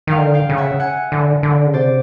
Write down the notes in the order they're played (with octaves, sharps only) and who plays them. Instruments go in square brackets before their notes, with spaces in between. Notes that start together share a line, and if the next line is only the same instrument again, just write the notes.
[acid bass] D#3 [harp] F5 G5
[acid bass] D3
[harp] F5 G5
[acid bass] C#3
[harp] E5 F#5
F#5 G#5
[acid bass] D3
D3
C#3
[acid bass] C3 [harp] C5 D5